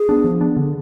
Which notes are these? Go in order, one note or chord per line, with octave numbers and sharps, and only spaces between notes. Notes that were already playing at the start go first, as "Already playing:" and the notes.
Already playing: G#4
B3 D4
F3
B3 D4
D3